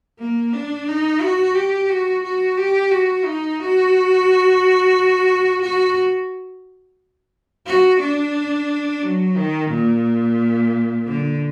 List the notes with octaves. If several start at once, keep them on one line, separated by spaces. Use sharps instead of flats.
A#3
D4
D#4
F#4
G4
F#4
F#4
G4
F#4
D#4
F#4
F#4
F#4
D4
F#3
D#3
A#2
D3